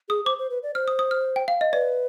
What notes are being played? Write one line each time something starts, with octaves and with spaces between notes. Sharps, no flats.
G#4 D#6
C5 D6
C5
B4
D5
C5 F6
D#6
D#6
F6
G5
F5
D#5
B4 D5